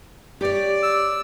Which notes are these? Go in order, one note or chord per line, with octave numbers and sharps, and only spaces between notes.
G4 C#5 D5
E6